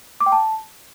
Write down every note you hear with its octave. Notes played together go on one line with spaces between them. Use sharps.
D6
G5
A5